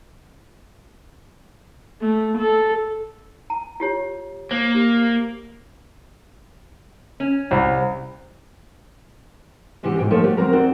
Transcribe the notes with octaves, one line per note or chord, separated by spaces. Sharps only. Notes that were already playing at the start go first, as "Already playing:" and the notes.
A3
A4
A#5
F4 G4 C#5
A#3 C5
G4
C#4
C2
G#2 C3 E3 C#4 F#4 G4
D#2 G#2 G5
D#3 F3 A3 A#3 A4 C#5
A3 F#4 G4
F3 F#3 C4 A#4 A#5
F2 C4 F#4 D5